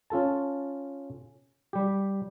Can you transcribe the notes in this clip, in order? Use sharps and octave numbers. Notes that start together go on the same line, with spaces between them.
C#4 F4 A4 A5
G3 G4